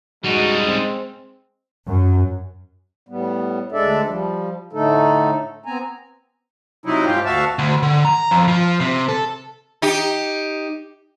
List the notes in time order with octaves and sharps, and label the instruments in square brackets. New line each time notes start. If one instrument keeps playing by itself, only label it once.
[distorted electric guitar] G3 D#4 [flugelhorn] G#3 [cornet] F#4
[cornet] C4
[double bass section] F#2
[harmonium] A2 G3 B3
D2 G#3 D4 A4 D5 E5
F3 G3
A2 D3 A3 D#4 A4
B3 C4 G#5 A#5
[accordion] C3 F#3 D#4 E4
G#2 F4 G4
D2 F#4 E5 F5 A5
[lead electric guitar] D2
D3
A#5
F2
F3
C3
A4
[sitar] D#4 G4